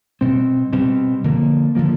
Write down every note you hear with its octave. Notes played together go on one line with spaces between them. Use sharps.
B2 G3 C4
B2 G3 C4
D3 F3 A#3
D3 F3 A#3